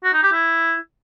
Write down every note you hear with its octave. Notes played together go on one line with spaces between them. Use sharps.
F#4
D#4
G4
E4